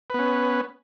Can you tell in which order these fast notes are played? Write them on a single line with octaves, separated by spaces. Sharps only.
B4 B3 C#4